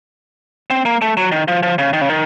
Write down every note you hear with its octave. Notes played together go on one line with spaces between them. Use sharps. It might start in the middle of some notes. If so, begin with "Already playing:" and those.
C4
A#3
A3
F#3
D#3
F3
F3
C#3
D#3
C#3
D#3